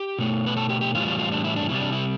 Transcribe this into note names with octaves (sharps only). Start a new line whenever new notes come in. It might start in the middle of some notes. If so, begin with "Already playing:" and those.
Already playing: G4
B2 A3
B4
A4
G4
G4
A2 E3 G3 F4
F4
F4
D4
E4
D4
C3 G3 E4
D4
E4